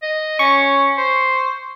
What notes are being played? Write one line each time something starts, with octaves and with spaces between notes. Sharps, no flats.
D#5
C#4 C#6
C5